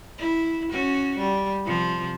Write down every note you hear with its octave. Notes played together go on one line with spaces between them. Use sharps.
E4
C#4 F#4
G3
C3 F3